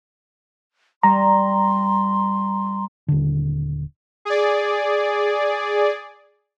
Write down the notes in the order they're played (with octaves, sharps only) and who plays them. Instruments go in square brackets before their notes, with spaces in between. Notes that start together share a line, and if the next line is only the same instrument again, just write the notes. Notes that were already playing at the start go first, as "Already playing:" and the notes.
[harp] G3 [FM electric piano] A#5 [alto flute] C6
[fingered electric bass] D#1 D3
[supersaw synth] G#4 D5